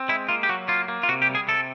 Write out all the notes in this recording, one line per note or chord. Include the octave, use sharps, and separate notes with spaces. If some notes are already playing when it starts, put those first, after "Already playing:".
Already playing: C4
G#3 E4
A#3 F4
G4
F#3 F#4
A#3 F4
A#3
F4
C3 F#4
G4
G3
G#4
C3 A4